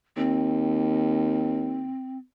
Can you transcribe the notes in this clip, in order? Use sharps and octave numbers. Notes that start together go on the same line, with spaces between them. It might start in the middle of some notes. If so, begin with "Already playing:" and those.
D#2 C4